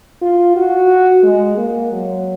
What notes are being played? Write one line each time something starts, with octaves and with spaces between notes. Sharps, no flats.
F4
F#4
G#3
A#3
F#3